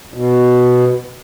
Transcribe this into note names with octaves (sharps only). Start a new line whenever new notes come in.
B2